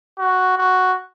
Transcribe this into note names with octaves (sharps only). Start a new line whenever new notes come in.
F#4
F#4